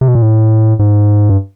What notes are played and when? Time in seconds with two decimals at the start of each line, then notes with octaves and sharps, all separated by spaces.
0.01 C3
0.08 B2
0.15 A#2
0.22 A2
0.79 G#2
1.29 G2